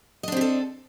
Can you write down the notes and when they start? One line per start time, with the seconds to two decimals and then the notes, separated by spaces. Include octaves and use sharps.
0.23 D#5
0.28 D4
0.32 C4
0.37 G4
0.41 A4